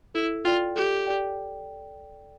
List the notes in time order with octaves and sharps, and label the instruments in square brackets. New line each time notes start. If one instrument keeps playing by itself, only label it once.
[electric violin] E4 [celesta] A4
[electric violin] F4 [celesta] D5 G5
[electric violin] G4 [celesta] A4
[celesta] D5 G5